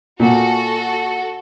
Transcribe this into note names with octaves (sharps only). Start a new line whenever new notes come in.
A#2 F#4 A4